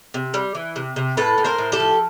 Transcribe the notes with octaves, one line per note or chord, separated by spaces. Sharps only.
C3
G3
E3
C3
C3
A2 A4 B4
A2
A#4 C5
A2
G4 A4
F3